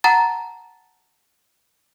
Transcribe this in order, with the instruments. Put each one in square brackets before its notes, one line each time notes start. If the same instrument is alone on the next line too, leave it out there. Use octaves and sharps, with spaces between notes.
[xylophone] F#5 A5 A#5 A6